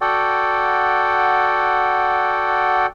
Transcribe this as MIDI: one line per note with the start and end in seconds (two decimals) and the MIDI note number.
0.01 2.86 66
0.01 2.86 69
0.01 2.86 74
0.01 2.86 78
0.01 2.86 79